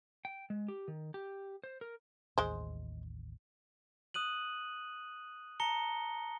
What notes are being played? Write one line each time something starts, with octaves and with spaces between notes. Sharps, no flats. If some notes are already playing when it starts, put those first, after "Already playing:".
G5
G#3
G4
D#3
G4
C5
A#4
A1 D#2 G#3 C5
D#6 F#6 D#7 F#7
A5 A#5 A#6 C#7 G7